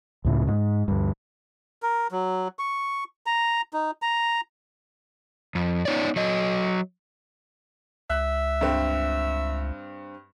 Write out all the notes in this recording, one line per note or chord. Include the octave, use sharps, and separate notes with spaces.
C#2 A2 C#3
G#2
D2 G2
A#4
F#3
C#6
A#5
D#4
A#5
F2
B3 D#4 C#5 D5
F#3 D#5
C#2 E5 F#6
G2 C4